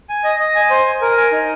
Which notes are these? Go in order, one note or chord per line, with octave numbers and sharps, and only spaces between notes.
G#5
D#5
D#5
G#5
C5
G#5
A#4
G#5
D#4